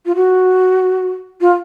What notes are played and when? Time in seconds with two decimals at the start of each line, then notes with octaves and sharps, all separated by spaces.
0.06 F4
0.16 F#4
1.41 F4